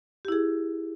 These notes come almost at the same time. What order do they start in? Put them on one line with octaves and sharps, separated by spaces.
G4 E4 G#4